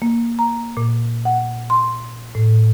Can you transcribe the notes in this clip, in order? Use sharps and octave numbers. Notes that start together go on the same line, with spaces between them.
A#3
A#5
A#2
F#5
C6
A2